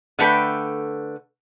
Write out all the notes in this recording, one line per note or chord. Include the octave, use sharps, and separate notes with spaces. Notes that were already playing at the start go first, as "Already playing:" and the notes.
D3 A3 B4 G5